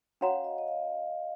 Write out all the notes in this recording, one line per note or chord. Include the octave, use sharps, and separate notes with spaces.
C#4 F#4 C#5 F5 F#5 A#5
D#5
D#5
F5